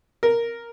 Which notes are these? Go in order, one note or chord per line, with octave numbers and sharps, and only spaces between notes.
A#4